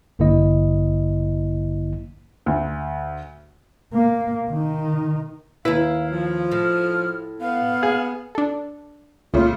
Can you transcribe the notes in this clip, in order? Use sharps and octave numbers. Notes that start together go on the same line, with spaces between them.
A1 G2 D3 A#3 E4 D#5
D2
A#3
D#3 D#4
D#2 E4 B4 F5
F3
A2 F6
B3 F5
G#4
D4 A4
C#2 A#2 C#3 A3 F4